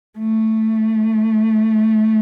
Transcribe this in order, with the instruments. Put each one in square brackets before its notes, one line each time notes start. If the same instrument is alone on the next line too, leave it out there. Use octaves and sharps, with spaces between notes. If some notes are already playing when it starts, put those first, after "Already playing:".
[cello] A3